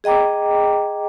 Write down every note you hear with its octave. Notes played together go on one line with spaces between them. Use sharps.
G#4 D#5 G5 A#5 D6